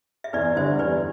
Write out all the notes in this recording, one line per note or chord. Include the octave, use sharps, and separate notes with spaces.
E5
E2 B4 D5
D3 G3 C5 E5
E2 B4 D5